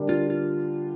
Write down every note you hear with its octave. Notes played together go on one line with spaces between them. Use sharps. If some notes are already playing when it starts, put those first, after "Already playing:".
Already playing: D3 G3 D4 A#4 D5
F4
F4